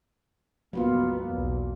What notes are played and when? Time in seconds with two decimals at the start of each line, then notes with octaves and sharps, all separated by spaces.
0.73 G1 C#2 F#3 A#3 B3 F4
1.26 B1 E2